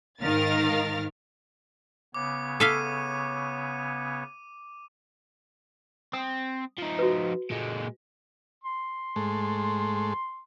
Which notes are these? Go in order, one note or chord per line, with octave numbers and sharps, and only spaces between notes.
G#2 D#3 A#4 F5 F6 A6
C#3 B3 C#5 D6
A4 E5 F5 D6 D#7
C4 D#6
F3 D#4
F#4 B4
A#2 G#3
C6
G#2 G#3 A3